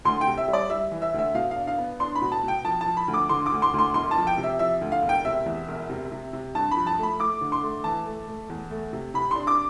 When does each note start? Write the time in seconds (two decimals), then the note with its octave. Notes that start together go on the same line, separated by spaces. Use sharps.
0.05 D2 C6
0.21 G5
0.27 C3
0.38 E5
0.48 G3
0.53 D5
0.70 G3 E5
0.91 E3
1.02 E5
1.14 D2 E5
1.35 B2 F5
1.51 D4 F5
1.67 F5
1.78 B3
2.00 D4 C6
2.15 B5
2.22 B2
2.32 A5
2.43 B2 G5
2.65 F3 A5
2.81 A5
2.86 F3
2.97 B5
3.08 D2
3.14 D6
3.29 D3 C6
3.46 D6
3.52 D2
3.62 C6
3.73 D2
3.79 C6
3.94 E1 C6
4.11 A5
4.17 F3
4.27 G5
4.38 C3
4.43 E5
4.59 F3 E5
4.81 D2
4.92 F5
5.02 E1
5.09 G5
5.25 C3 E5
5.46 E2
5.68 E1
5.89 C3
6.12 C3
6.33 C3
6.55 G2 A5
6.71 B5
6.77 F3
6.87 A5
6.98 A3
7.03 B5
7.20 A3 D6
7.41 D3
7.52 C6
7.62 A3
7.84 E3 A5
8.06 A3
8.28 A3
8.50 E2
8.71 A3
8.93 C3
9.14 C3 B5
9.31 D4 C6
9.47 D6